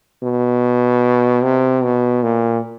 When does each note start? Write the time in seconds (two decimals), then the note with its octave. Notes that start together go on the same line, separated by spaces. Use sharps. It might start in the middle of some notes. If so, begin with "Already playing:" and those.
0.23 B2
1.44 C3
1.84 B2
2.23 A#2